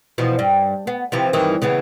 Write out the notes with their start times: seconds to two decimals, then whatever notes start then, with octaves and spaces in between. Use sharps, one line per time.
0.18 E2 B2 F3
0.39 G2
0.87 B3
1.12 C3 E3 F3
1.33 G2 D#3 E3
1.62 C#3 E3 B3